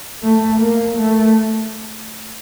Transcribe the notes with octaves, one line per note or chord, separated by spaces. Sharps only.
A3
A#3
A3